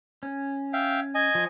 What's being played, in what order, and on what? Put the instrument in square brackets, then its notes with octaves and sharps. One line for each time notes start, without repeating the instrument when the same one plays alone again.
[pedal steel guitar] C#4
[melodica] E5 F5 G5
D#5 G#5
[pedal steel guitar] F3